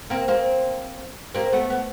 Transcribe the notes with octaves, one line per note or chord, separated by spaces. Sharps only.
A#3 C4
A#3 C4
A#3 C4
A3 B3
B3